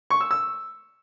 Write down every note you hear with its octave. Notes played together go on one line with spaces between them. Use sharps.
C#6
E6
E6